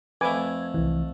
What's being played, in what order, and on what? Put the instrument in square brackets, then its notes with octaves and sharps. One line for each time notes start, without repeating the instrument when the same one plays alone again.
[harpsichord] F2 A3 [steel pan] B4 G#5 D6 [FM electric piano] G#6
[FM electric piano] C2 E3